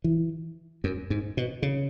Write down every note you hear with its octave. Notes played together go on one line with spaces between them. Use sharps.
E3
F#2
G#2
B2
C#3